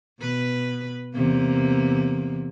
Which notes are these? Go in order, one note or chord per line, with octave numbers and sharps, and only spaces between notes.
B2 B4
E2 C3 A#3